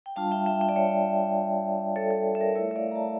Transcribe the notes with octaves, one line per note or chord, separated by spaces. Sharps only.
G5
G3 D4 F4 F5 A5
E5 G5
E5 G5
E5 G5
D5
C#5 E5
A4 C#5
A4
E5
A#4 D5
A3 E4 C#5 E5
E5
D5 F5
A#5
F5 A5